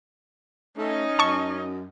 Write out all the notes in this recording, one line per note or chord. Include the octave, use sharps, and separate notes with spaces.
A3 C#4 D#4 D#5
F#2 A5 C#6